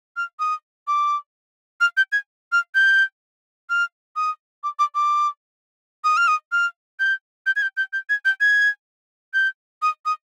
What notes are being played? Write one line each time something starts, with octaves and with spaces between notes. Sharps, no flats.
F6
D#6
D6
F6
G6
G#6
F6
G6
F6
D#6
D6
D6
D6
D#6
F6
D#6
F6
G6
G6
G#6
G6
G6
G6
G#6
G6
G#6
G6
D#6
D#6